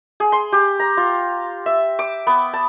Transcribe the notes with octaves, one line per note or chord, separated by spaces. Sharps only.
G#4
C6
G4
A#5
F4
E5
D6
B3
A5